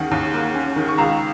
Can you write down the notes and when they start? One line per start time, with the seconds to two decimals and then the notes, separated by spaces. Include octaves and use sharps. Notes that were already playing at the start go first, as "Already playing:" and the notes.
Already playing: D#2 D#3 A#3 C#4 F#5 G#5
0.11 D#2
0.34 A#3
0.55 C#4
0.76 D#3
0.88 C#6
0.98 C#2 A#5